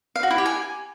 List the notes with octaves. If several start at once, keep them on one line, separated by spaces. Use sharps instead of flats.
F5
F#4
E4
G4
G#5